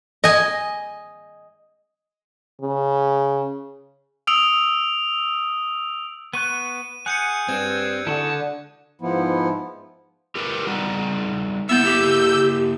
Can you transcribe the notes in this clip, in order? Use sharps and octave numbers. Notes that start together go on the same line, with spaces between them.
D#5 G#5
C#3
D#6 E6 D7 F7
B3 C#6 F#6 D#7
G#4 F#5 G#5 F#6 G6 C#7
G2 C4 G#6
C#2 D3 E4 F#4 G#4 A5
G#2 F3 B3 E4
G4 A#4 B4
G3 D#4 F#4
A#3 B3 E4 E5 E6 G6
G4